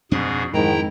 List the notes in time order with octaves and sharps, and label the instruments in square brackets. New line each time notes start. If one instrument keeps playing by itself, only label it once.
[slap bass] F2 C4 D4 [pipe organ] G#2 B2 G#4
[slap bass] F2 [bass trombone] G#2 [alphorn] D#3 [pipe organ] E4 G5 A#5